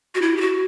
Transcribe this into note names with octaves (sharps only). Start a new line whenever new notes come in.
F#4
E4
G4
F#4